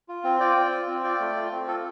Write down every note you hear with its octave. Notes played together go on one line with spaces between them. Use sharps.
F4
C4
F4 D5 G5
C4
F4
C4
F4 D5 G5
A3
F4
C4
F4 A4